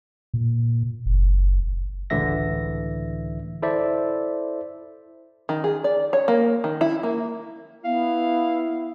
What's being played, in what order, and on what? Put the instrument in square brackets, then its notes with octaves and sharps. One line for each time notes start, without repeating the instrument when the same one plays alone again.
[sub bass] A#2
F#1
[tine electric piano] C#2 A2 D3 E3 E5 A#6
E4 A4 C5 D5 E5
[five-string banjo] D#3
G#4
D5
C#5
A#3
D#3
E4
A#3
[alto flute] B3 [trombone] E4 [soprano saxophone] F5